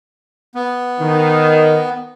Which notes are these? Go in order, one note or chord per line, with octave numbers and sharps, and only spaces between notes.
B3
D#3